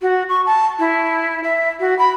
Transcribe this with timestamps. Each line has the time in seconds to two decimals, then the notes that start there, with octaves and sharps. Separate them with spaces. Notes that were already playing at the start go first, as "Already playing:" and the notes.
0.02 F#4
0.29 C#6
0.46 A5
0.79 E4
1.44 E5
1.80 F#4
1.99 B5